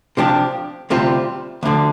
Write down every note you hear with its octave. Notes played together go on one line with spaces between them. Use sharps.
C3 F3 D4 G4
D2 C3 G3 C4 F4
D2 D3 F3